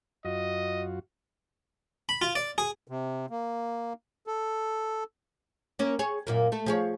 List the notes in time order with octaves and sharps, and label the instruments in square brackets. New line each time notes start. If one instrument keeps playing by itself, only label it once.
[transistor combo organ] F#2 F4 F#4 [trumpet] D#5
[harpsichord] B5
F4
D5
G#4
[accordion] C3
A#3
A4
[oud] A#3 C#4
G#4 C#5
F#2 A#2 A#3
A3 A4
F3 G#4 C#5